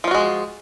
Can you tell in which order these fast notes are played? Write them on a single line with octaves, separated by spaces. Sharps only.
F3 F4 F#4 G#3